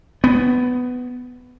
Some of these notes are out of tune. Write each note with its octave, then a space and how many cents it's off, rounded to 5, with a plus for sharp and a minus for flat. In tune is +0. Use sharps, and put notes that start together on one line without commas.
B3 +10